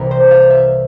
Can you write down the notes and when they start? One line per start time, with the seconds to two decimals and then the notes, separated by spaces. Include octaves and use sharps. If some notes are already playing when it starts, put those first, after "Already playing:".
Already playing: C2 C3 E3 A#4
0.11 C5
0.31 F5
0.50 E5